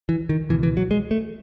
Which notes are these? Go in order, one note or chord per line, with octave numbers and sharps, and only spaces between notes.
E3
D#3
C#2 B2 E3
E3
F#3
G#3
A3